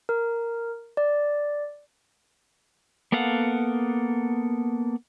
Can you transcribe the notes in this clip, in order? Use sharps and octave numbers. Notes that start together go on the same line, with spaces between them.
A#4
D5
A#3 B3 A4 F5 F#5